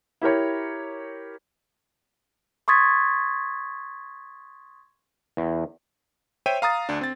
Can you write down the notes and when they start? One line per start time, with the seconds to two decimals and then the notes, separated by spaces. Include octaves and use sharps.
0.22 E4 G4 A#4 C#5
2.68 C6 C#6 D#6 G#6 A6 B6
5.37 E2
6.46 C5 C#5 E5 G5 D#7
6.62 F5 A#5 D#6 A6
6.89 D2 D4
7.01 C4 A6